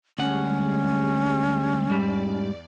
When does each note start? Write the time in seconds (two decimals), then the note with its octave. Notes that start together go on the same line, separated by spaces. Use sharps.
0.19 D2 G3 G#3 C#4 F#5
1.90 E2 G#2 G3 D5